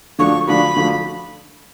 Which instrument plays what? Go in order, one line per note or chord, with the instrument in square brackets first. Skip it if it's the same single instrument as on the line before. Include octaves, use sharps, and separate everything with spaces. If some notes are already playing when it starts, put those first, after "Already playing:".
[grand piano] D3 F3 A3 D4 F#4 [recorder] C#6
[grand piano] D3 F3 A3 D4 F#4 [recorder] B5
[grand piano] D3 F3 A3 D4 F#4